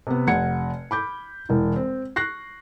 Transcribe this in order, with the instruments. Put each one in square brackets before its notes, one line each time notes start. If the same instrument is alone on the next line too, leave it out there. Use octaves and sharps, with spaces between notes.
[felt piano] C3 B3
F1 F#5 G#6 C#7
B5 D6 G6
E1 E3
C4
C#6 F#6 A#6 C7